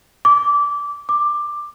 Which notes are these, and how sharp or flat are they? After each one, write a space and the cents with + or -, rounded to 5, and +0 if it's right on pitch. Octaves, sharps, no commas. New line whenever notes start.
D6 -20
D6 +15